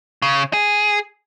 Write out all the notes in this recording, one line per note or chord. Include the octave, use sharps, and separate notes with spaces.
C#3
G#4